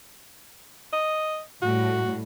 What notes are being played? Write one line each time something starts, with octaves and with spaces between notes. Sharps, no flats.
D#5
A2 G3 F#4